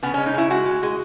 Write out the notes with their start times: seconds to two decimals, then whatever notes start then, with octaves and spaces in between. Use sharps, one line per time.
0.03 C#3 B3
0.14 C#4
0.18 G#3
0.26 D#4
0.34 C#3 E4
0.50 G#3 F#4
0.66 G#3
0.83 G#3